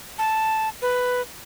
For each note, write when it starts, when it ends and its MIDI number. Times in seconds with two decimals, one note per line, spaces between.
0.18 0.69 81
0.82 1.21 71